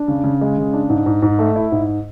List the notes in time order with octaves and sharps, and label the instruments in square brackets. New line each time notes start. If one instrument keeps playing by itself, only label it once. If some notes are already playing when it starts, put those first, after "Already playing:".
Already playing: [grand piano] D4
C#3
C#3
G#3
C#3
D4
G#2
G#2
G#2
A3
E4
G#2